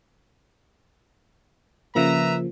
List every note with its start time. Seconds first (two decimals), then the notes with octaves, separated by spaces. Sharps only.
1.95 C#3 F3 A#3 B4 E5 A#5